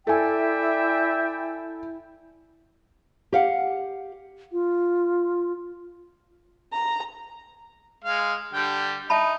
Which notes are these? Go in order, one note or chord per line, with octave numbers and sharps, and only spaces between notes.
E4 A4 D5 E5 G5 G#5
G4 F5 F#5
F4
A#5
G#3 F5
D3 G3 G5
D#4 E5 A5 B5